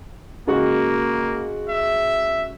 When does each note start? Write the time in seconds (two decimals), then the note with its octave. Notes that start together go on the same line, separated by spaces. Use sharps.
0.47 C#3 G#3 A#3 F#4
1.69 E5